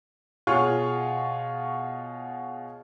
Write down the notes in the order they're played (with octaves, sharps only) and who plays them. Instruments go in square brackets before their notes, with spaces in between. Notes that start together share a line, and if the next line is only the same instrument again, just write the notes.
[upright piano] B2 F4 G#4 C#5 C#6 F6